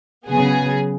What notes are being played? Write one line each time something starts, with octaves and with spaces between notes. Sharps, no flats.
C#3 F#3 B3 G#4